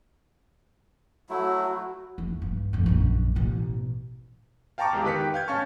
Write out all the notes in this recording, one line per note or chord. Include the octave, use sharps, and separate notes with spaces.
F#3 A3 E4 F#4
E2
G2
A#1 F2
A#1 F#2
A1 B2
F5 G5 A5 A#5 C#6 D6
E2 G#3 G4
D#3 G4 B4 F#6 B6 C#7
G5
F5 G6 G#6
C#4 F5 A5 C#6